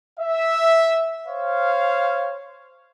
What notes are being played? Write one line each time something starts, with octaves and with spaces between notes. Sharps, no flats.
E5
C5 C#5 F5